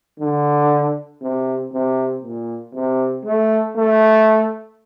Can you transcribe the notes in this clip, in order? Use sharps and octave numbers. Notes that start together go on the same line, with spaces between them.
D3
C3
C3
A#2
C3
A3
A3